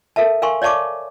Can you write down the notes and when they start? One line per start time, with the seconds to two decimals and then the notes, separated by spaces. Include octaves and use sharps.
0.16 A4 A#4 E5 A5
0.42 A#4 F5 G#5 C6 C#6
0.62 C#5 D5 F5 A5 C#6 D6